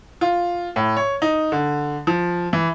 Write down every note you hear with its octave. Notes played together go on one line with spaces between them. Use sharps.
F4
A2
C#5
D#4
D3
F3
E3